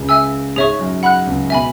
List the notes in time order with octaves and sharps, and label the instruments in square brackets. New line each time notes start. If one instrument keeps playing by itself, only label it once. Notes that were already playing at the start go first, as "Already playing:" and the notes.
Already playing: [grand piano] C#2 C#3
[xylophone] E5 G#5 E6
[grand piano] G#2 [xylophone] G#4 C#5 E5 C#6
[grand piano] F#2
[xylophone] F#5 B5 F#6
[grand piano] C#2 C#3
[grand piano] B2 [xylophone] E5 G#5 B5